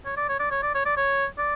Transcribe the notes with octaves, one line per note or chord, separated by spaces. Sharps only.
C#5
D5
C#5
D5
C#5
D5
C#5
D5
C#5
D5